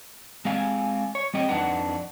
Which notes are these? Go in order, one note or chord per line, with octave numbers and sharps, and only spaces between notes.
G#3 C4 F5 G#5
C#5
G3 C4 D#5 G5
F2 D4 D#4 B4 F#5